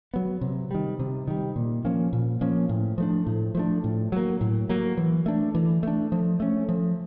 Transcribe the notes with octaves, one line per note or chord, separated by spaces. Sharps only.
F#3 B3
C3
D#3 G3
C3
D#3 G3
A#2
F3 A#3 C#4
A#2
F3 A#3 C#4
A2
F3 A3 D4
A2
F3 A3 D4
A2
F#3 A#3
A2
F#3 A#3
E3
A3 D4
E3
A3 D4
F3
A3 C#4
F3